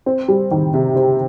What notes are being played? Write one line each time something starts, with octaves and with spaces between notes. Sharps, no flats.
C4
G3
D#3
C3
C4